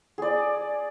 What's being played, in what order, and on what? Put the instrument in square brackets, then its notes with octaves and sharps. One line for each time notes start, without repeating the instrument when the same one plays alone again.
[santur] G#4 D5